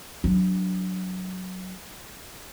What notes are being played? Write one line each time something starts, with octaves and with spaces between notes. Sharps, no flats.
F#3 D4